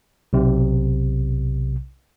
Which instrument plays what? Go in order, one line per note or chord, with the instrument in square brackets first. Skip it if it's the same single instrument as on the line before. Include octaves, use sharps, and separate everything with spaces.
[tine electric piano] B1 C3